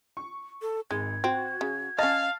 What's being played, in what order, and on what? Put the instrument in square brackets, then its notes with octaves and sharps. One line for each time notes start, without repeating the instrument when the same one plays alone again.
[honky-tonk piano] C#6
[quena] A4
[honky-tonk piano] G#1 [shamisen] G#3 [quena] G#6
[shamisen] C4 [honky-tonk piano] F#4
[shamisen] C#3
[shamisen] C#4 D#5 [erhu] F5 [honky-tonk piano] A5 A6